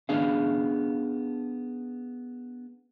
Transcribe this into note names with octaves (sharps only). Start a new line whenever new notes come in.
B3 C#4 D4 G#4 F5